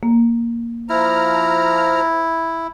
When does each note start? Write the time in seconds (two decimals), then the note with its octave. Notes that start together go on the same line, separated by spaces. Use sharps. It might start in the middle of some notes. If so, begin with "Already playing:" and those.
0.03 A#3
0.89 F3 E4 A#5 F6